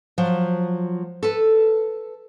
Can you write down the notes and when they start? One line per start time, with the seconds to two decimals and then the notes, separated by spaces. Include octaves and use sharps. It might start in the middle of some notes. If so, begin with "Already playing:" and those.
0.18 F3 F#3
1.23 A4 B4